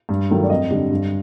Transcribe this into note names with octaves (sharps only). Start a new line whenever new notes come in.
G2
D#3 F#3 A3
D5
F2 D#5
D3 G3
G2